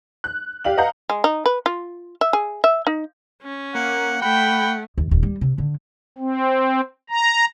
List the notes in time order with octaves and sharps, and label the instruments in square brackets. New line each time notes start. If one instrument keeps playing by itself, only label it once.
[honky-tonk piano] F#6
G4 D5 F5 F#7
B4 D#5 F5 F#5 A#5 G6
[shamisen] G#3
D#4
B4
F4
E5
G#4
E5
D#4
[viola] C#4
[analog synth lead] A#3 [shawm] F#5
[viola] A3 [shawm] F#5 [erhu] G5 [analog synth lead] B5
[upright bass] D#2
D#1
G3
C3
D3
[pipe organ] C4
A#5